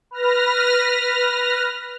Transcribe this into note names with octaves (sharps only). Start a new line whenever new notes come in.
B4 F6 A#6